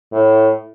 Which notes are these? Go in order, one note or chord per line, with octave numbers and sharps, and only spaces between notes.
A2